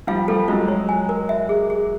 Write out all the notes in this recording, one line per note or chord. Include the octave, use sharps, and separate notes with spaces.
F3 G3 F5
F3 G3 A4
F#3 G#3 F4
C#5
G#5
A#4
E5
G#4
G#4